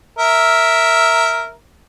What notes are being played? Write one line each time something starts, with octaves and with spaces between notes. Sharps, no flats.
A#4 E5